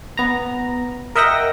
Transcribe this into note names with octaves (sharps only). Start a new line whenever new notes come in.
B3 A#5
A#4 D#5 E5 F#5 G5 A#6